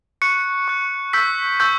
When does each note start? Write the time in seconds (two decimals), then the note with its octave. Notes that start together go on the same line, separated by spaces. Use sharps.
0.22 C#6 F#6 C#7
0.68 C#6 F#6
1.13 C#6 E6 G6 B6
1.60 C#6 E6 G6